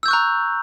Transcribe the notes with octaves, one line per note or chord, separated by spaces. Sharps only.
A#5 C#6 E6 F#6 G6